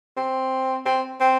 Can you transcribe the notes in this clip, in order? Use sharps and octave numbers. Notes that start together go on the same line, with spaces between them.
C4
C4
C4